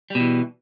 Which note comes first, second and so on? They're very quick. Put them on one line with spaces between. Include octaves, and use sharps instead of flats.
G3 B2 E3